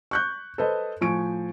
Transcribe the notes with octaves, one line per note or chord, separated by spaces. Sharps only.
C#6 F#6 G6
A4 B4 C5 D#5
A2 F3 G#5 C#6 D7